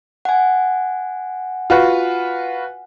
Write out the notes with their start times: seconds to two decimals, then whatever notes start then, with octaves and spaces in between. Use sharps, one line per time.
0.25 F#5 G#5
1.70 F4 F#4 B4